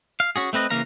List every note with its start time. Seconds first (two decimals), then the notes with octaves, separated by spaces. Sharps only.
0.20 F5
0.36 C#4 F#4 G#4
0.53 A3 C4 B4 D#5
0.70 C#3 E3 A#3 F5 A#5